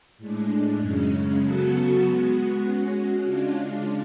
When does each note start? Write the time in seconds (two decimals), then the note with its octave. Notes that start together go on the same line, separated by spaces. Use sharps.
0.18 A2 G#3 D4
0.79 F#2 C#3 G#3 C#4
1.40 C#3 F#3 B3 F#4 A4
2.02 G#3 B3 F#4
2.63 G#3 C#4 F#4
3.23 C#3 G#3 D4 F4